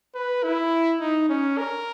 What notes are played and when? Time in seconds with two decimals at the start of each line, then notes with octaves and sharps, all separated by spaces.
0.15 B4
0.43 E4
1.01 D#4
1.29 C#4
1.58 A#4